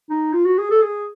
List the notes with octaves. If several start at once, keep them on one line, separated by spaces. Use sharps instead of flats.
D#4
F4
F#4
G#4
A4
G#4